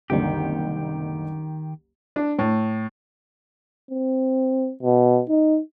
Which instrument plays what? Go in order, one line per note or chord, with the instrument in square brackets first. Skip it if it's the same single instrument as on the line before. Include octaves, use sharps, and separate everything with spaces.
[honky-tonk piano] F#1 C2 D3 [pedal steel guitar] D#3 G4
[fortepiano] D4
A2
[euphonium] C4
B2
D#4